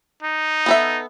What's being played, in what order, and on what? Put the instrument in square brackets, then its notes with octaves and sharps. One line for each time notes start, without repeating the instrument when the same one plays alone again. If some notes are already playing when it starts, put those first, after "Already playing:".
[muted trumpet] D#4
[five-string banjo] B3 A4 E5